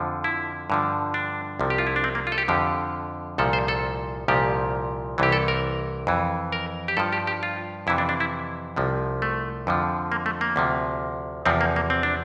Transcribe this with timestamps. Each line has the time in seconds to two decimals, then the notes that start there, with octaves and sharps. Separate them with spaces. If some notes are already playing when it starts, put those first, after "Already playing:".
Already playing: F2 D3 F3
0.24 E4
0.70 G2 D3 F3
1.14 D4
1.60 C2 C3 F3
1.70 G4
1.78 F4
1.87 E4
1.96 D4
2.04 C4
2.15 A#3
2.27 F4
2.32 A4
2.38 G4
2.48 F2 D3 F3 G4
3.38 C2 A#2 F3 A4
3.53 C5
3.68 A4
4.28 C2 A#2 F3 G4
5.18 C2 C3 E3 G4
5.32 A4
5.48 A#4
6.07 F2 E3
6.52 A#4
6.88 G4
6.97 G2 F3 A4
7.13 G4
7.27 G4
7.43 F4
7.87 F2 C3 E3 E4
7.98 D4
8.09 D4
8.20 E4
8.76 C2 C3 F3
9.22 A3
9.67 F2 D3 F3
10.12 A#3
10.26 A3
10.41 A#3
10.56 D2 C3 F3
11.46 E2 C3 F3 C4
11.61 A#3
11.76 A#3
11.90 C4
12.03 D4